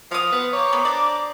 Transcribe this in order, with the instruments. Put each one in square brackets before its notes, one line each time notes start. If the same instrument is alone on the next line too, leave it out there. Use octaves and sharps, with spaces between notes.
[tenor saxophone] F3 [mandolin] F5 D#6
[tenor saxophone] B3
[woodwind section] C5 A#5 D6 [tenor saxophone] C#5
[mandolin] B3
[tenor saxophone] D4 [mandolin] D5